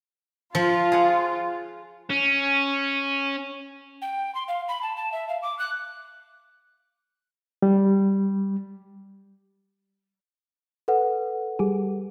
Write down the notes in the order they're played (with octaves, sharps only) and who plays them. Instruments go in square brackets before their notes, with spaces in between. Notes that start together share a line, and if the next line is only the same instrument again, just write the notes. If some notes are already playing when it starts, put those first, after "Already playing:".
[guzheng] F3 [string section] F4
[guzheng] G#4 F#5
[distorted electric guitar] C#4
[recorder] G5
C6
F5
B5
A5
A5
E5
F5
D6
F#6
[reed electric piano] G3
[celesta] A4 B4 F#5
[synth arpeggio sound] G3 G4 G#4